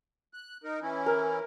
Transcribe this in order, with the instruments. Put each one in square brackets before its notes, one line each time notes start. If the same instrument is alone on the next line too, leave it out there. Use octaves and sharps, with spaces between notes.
[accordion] F#6
D#4 A#4
E3 C#4 E4
[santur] A#4